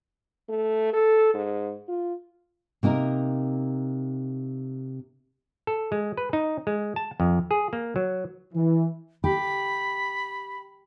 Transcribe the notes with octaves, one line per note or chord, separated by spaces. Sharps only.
A3
A4
G#2
F4
C3 A#3 D#4 A#4
A4
G#3
B4
D#4
G#3
A5
F2
G#4
A#3
F#3
E3
G4 B5